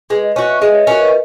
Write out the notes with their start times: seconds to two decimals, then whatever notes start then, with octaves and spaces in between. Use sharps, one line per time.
0.10 G#3 B4
0.23 D#5
0.36 C#4 F#4 D#5
0.49 E5
0.61 G#3 D#5
0.75 C#5
0.87 C#4 F#4 A#4
1.01 B4